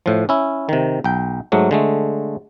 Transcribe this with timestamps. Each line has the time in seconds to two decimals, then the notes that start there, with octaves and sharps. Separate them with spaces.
0.06 A2 F3
0.29 C#4 E4
0.69 C3 D#3
1.04 B1 G5
1.52 G#2 F#3 A3
1.71 D3 G#3 A3